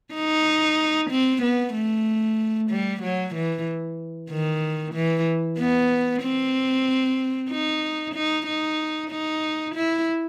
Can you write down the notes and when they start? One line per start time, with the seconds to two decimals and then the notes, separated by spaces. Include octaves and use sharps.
0.14 D#4
1.11 C4
1.42 B3
1.74 A3
2.70 G3
3.02 F#3
3.35 E3
4.30 D#3
4.94 E3
5.59 B3
6.22 C4
7.50 D#4
8.14 D#4
8.46 D#4
9.10 D#4
9.75 E4